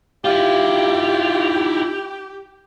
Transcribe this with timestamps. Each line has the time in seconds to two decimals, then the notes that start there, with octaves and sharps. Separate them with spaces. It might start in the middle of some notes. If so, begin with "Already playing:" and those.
0.25 E4 F4 G4